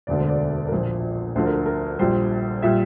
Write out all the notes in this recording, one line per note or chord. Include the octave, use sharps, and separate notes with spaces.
E1 D2 D3 D5
C5
D5
A#4
A#1 A#2 F3 C5
D2 D3 F3 C5
A#4
A4
A#4
A#1 A#2 G3 C5
A#2 G3 E5